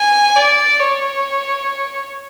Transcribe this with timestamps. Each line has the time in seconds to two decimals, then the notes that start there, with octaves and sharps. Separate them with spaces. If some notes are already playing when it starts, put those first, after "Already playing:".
Already playing: G#5
0.36 D5
0.79 C#5